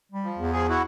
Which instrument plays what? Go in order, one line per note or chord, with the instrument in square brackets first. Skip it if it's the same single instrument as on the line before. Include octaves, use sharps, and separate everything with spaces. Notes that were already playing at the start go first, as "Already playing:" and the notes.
[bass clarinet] G3
[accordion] F3
[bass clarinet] E2
[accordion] F3 G#4
E4 F#4